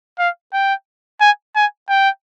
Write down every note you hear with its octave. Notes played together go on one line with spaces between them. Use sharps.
F5
G5
G#5
G#5
G5